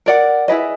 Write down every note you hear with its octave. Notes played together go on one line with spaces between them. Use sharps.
A#4 D5 F#5
E4 G#4 B4 D#5